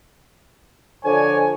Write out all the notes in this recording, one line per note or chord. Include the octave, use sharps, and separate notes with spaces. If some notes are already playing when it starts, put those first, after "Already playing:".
D3 F3 C#5 D5 G#5